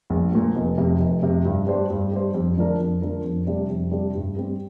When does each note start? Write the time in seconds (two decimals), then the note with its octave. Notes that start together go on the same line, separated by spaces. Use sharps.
0.10 A#1
0.32 A#2 F3
0.56 F1
0.78 F2 C3
1.00 F1
1.22 F2 C3
1.45 G2
1.67 G3 D4 G4 C5
1.90 G2
2.12 G3 D4 G4 C5
2.34 F2
2.57 D3 F3 D4 A#4
2.80 F2
3.02 D3 F3 D4 A#4
3.24 F2
3.47 C3 G3 D4
3.70 F2
3.91 C3 G3 D4
4.15 G2
4.37 G3 C4